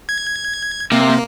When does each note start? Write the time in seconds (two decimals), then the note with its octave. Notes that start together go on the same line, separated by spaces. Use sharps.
0.09 G#6
0.92 C3 A#3